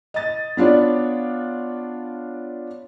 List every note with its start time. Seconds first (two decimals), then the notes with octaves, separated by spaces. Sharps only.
0.14 D#5 A6
0.57 B3 D4 F4 C#5 D5